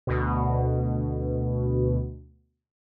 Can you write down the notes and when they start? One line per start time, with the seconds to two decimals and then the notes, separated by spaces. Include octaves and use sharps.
0.07 D2 B2